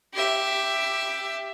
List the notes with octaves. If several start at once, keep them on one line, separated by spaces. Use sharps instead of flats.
G4 E5